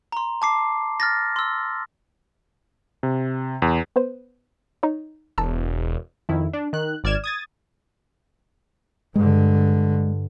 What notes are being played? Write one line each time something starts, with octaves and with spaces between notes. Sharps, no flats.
A#5 C6
A5 D6 C7
F6 A6 A#6
C6 E6
C3
E2
B3 B4 C5
D#4 C#5
E1 A5 A#5 E6
F2 D#3 E4
D4
D#3 F#6
G#1 D5 F6 G#6 E7
D#6 G#6 A6
G2 D3 G#3